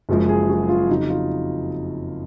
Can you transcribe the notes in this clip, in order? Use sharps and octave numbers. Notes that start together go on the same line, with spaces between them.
F#1 F#2 F3 G#3
G#4
F#4
F4
F2 C#3 F#3 D#4
F4